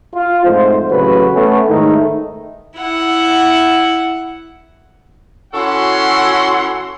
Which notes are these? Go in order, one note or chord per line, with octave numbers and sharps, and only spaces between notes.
F4
F2 G#2 A3 C5
A1 C#3 F#3 A3 F#4 B4
A3 B3 C#4
G#2 D#3 A3 D#4 E4
E4 F#5
E3 C#4 F#4 A4 F#5 C6